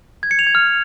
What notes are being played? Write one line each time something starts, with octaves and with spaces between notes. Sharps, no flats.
G#6
C#7
F7
G#6
F6